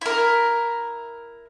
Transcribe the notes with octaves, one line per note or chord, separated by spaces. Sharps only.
E4 A#4